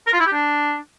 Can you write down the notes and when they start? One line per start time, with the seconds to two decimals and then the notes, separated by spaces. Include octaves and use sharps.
0.07 A#4
0.13 F4
0.20 E4
0.26 G4
0.33 D4